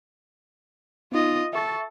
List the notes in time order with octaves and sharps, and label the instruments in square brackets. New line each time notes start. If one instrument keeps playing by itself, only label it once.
[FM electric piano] B3 D#4 [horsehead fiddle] F4 D#5
[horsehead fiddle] A4 [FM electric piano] E5 C#6 A6